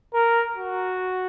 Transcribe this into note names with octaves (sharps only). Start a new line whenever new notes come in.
A#4
F#4